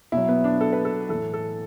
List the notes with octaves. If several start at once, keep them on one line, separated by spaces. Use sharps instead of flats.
B2 E4
F#3
B3
D4
A4
B4
A4
A2 E3 A4
A4